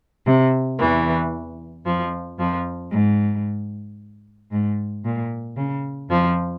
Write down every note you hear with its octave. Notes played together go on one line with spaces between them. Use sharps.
C3
E2 E3
F2 F3
F2 F3
G#2
G#2
A#2
C#3
F2 F3